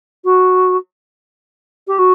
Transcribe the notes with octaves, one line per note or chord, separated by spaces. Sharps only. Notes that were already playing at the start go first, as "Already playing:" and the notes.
F#4
G4
F#4